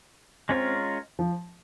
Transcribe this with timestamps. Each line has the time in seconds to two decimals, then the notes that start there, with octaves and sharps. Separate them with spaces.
0.49 G#3 C4 C#4 F4 A#4
1.19 F3